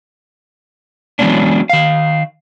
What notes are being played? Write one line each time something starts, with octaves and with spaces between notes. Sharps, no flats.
E3 F#3 G#3 B3 C#4 D4
D#3 F5